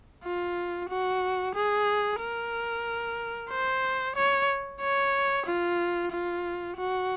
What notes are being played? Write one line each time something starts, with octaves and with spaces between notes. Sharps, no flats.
F4
F#4
G#4
A#4
C5
C#5
C#5
F4
F4
F#4